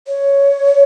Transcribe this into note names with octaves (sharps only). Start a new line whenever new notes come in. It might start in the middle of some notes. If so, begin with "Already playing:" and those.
C#5